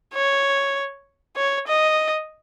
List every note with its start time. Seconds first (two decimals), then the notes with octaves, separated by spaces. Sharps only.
0.14 C#5
1.37 C#5
1.67 D#5